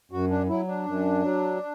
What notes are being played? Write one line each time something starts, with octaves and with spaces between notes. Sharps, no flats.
F#2 F#4
D4
F#3 E4
D4
F#2
F#3